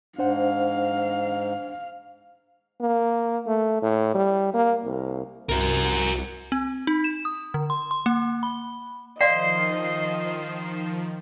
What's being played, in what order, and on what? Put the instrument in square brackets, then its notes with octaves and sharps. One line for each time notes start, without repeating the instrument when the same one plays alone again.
[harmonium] G#2 [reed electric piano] D4 C5 F#5 [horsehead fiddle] F5
[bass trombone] A#3
A3
A2
G3
A#3
C2
[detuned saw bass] C2 [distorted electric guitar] F#4 A#4
[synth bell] C4
D#4
E7
D#6
D3
C6
C6
A#3
B5
[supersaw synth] D#3 F3 [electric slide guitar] C5 [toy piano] D5 F5 [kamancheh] D#5